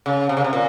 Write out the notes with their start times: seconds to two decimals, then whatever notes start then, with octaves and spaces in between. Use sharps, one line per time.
0.06 C#3
0.29 C3
0.37 C#3
0.44 C3
0.53 A#2